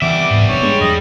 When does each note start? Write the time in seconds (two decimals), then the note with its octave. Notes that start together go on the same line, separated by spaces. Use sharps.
0.02 E3 G3 B3 E5 D6
0.30 G#2
0.49 F1 D4 C#5
0.63 G#3 D4
0.81 E2 F#3 D#5